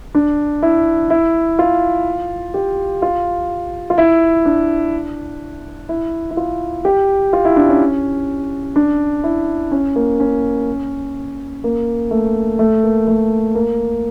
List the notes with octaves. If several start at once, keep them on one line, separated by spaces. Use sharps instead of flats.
D4
E4
E4
F4
G4
F4
F4
E4
D4
E4
E4
F4
G4
F4
E4
D4
C#4
D4
E4
C#4
A#3
C#4
A#3
A3
A3
A#3
A3
A#3